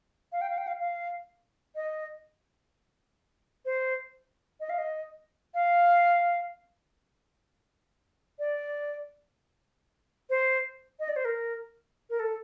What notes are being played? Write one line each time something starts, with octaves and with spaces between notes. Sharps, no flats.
F5
G5
F5
G5
F5
F5
D#5
C5
D#5
F5
D#5
F5
D5
C5
D#5
D5
C5
A#4
A#4
A4